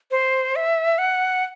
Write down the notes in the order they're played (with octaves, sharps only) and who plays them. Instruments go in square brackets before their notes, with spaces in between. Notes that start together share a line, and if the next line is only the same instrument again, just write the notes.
[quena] C5
E5
F#5